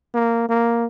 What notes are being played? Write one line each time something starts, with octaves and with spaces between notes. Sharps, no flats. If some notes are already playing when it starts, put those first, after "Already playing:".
A#3
A#3